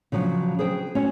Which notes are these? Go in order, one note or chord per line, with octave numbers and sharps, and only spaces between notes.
C#3 F3 F#3 D4
G#4 B4 C5 G5
C#4 F#4 C#5